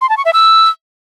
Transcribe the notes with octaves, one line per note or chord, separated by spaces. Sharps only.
C6
A5
C#6
E5
E6